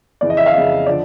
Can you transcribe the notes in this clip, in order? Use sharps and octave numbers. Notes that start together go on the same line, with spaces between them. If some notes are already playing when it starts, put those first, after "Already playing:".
F2 C#3 E3 D5
D#5
E5
F5
F2 C#3 E3 E5
D3 F3 D5